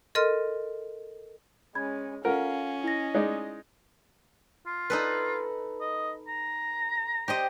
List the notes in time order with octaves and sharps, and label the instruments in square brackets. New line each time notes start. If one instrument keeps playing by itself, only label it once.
[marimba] A4 A#4 D#5 C6 F6
[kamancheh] G#3 C#4 [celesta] B5 G#6
[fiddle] C#4 [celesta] F4 A4 F#5 [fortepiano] A#4 [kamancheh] F5
[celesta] E4 A#6 [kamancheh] D#5
[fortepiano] G#3 D#4 D5
[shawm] F4
[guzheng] D#4 A4 B4
[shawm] D#5
A#5
[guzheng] G4 C5 D#5